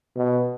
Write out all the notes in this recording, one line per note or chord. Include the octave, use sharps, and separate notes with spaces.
B2